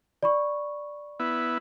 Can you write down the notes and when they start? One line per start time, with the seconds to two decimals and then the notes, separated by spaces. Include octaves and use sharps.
0.23 D5 B5 C#6
1.19 B3 E4